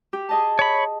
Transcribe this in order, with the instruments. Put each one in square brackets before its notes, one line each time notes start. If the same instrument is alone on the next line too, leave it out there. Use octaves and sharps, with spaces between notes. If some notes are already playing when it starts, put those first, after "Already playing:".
[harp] G4
G#4 D#5 A5
[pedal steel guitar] C#5 B5